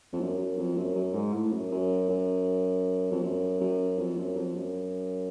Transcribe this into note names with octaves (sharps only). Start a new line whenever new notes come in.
F2
F#2
F#2
F2
F#2
F#2
G#2
A2
F#2
F#2
F#2
F2
F#2
F#2
F2
F#2
F2
F#2